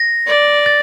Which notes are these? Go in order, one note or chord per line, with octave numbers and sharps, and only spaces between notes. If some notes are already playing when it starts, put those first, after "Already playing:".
Already playing: A#6
D5
A6